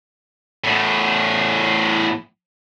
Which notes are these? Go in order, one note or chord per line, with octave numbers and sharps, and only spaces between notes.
E2 A2